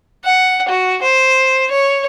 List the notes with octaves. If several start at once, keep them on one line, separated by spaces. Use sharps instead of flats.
F#5
F#4
C5
C#5